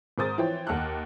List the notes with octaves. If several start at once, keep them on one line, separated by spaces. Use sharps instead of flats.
G#1 G#4 A#4 C5 D#6 A6
E3 F3 C5 C#5 G5
D#2 F#5 A5 F6 F#6